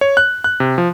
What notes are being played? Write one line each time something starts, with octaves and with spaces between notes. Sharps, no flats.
C#5
F#6
F#6
C3
F3